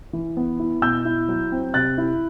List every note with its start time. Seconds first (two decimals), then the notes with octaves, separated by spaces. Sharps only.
0.13 E3
0.37 B3
0.60 E4
0.82 B2 E6 G6
1.05 E4
1.29 F#3
1.52 C4
1.74 C3 F#6 A6
1.98 E4